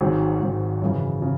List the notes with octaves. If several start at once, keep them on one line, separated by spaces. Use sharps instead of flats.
G#1 G#2 D#3 F#3
G#1 G#2 D#3 F#3
F#2 C#3 E3
C#3